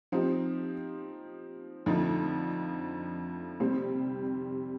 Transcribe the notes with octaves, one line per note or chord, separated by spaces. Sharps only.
F3 C4 D#4 G4
F2 D3 F3 A3 D#4
C3 G3 C4